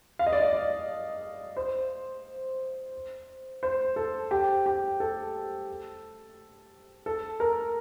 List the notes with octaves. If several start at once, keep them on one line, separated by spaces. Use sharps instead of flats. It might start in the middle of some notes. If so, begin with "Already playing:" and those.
F5
D#5
D5
D#5
D5
C5
C5
A4
G4
G4
A4
A4
A#4